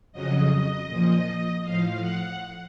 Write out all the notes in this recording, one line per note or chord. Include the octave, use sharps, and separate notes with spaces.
F2 C#3 F#3 D#5
A#2 F3
A2 F3 F5
F#5